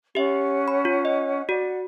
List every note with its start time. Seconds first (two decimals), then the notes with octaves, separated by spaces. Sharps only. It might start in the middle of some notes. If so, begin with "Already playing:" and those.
0.15 C#4 G4 E5 F#5
0.68 B5
0.85 F4
1.05 D#5
1.49 F#4 D5 F#5